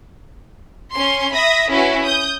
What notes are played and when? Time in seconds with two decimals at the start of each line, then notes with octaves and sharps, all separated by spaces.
0.93 C#4 C6
1.33 E5 B5 D#6 A#6
1.70 C#4 E4 F#4 B4
2.03 D#6 G6